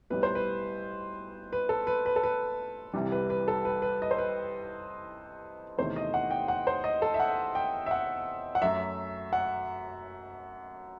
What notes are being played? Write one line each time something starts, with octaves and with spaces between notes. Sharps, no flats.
B1 A2 G3 B4
C5
B4
B4
A4
B4
B4
A4
B4
C2 C3 E3 G3
B4
B4
A4
B4
B4
D#5
C5
B4
E2 C3 D#3 A3 C5
D#5
F#5
G5
F#5
C5
D#5
A4
E5
F#5
G5
E5
F#5
F#5
F#2 F#3 A3 E5
F#5